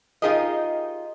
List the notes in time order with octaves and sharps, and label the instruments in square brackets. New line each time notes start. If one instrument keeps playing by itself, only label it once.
[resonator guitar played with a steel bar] D#4 F4 G4 G#4 A#4 D#5